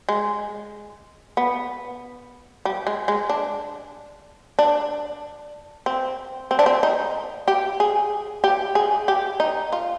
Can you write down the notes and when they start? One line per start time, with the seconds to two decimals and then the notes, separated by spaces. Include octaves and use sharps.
0.09 G#3
1.37 B3
2.65 G3
2.87 G#3
3.08 G#3
3.29 D4
4.59 D4
5.86 C4
6.51 C4
6.59 D4
6.66 C4
6.83 D#4
7.48 G4
7.80 G#4
8.44 G4
8.75 G#4
9.08 G4
9.40 D#4
9.72 F4